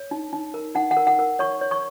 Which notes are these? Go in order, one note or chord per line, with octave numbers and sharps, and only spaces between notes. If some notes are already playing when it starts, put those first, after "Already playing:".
Already playing: C#5
D#4
D#4
A#4
D#4 F#5
F#5
A#4
F#5
A#4
C#5 C#6
C#5
C#6